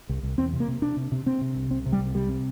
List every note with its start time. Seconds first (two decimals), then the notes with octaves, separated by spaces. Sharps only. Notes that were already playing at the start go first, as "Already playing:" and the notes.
0.09 C2
0.23 C2
0.38 E2 C4
0.53 C3
0.60 A#3
0.68 C3
0.82 C3 D4
0.97 C3
1.12 C3
1.26 C3 C4
1.41 C3
1.55 C2
1.71 C2 C4
1.86 C3
1.92 G3
2.00 C2
2.15 C3 G3
2.29 C3